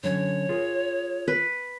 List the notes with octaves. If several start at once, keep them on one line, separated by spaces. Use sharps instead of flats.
D3 F#3 C#4 C#5
F4 G#4 A#4
B4